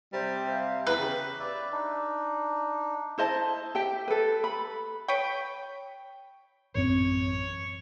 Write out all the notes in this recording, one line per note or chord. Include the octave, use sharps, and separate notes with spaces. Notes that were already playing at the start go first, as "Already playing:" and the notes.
C3 G3 C5
F5
E2 B4 A#5
C#3 G4
B4 D5 E5
D4 D#4
E4 C5 D#5 A5
G4 E5 G5
A4 B4
B5
B4 C#5 G5
A1 F#2 C4 C#5